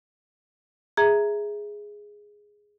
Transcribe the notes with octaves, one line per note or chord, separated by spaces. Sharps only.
G#4 E5 A#5